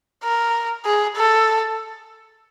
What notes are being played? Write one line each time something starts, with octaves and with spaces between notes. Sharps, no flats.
A#4
G#4
A4